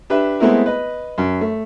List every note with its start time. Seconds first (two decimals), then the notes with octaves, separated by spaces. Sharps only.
0.10 D4 G4 B4 E5
0.40 G#3 A3 B3 C4 E4 A#4
0.66 B4 D#5
1.18 F#2
1.41 A3